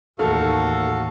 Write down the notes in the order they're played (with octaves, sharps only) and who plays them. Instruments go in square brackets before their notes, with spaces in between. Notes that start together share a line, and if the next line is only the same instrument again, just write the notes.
[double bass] A1 D#2 [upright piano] D#3 A3 F6 [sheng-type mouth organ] F#4 A4 F5